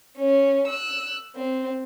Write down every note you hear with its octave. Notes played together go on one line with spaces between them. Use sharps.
C#4
E6 F#6
C4